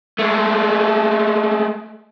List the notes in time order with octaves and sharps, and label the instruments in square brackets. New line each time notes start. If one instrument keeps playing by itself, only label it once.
[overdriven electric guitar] G#3 A3